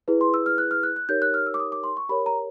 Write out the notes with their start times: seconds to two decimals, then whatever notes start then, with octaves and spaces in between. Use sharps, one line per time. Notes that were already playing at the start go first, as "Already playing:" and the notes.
0.08 E4 G#4 B4
0.21 C6
0.34 E6
0.46 F6
0.58 F#6
0.71 F6
0.83 F#6
0.96 F#6
1.09 D#4 G4 A#4 C#5 G6
1.22 F#6
1.34 F6
1.46 E6
1.54 D6
1.60 D#6
1.72 D6
1.84 C6
1.97 C#6
2.09 G4 A#4 C#5 B5
2.26 A#5